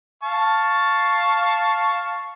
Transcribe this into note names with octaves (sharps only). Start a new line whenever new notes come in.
F5 A5 C#6